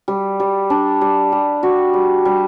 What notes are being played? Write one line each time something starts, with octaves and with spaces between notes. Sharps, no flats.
G3
G3
D4
G3
G3
F#4
G3
G3